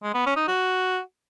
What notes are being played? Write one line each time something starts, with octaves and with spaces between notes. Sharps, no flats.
G#3
B3
C#4
D#4
F#4